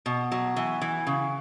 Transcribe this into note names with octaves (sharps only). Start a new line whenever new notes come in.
B2
F#3
E3
E3
C#3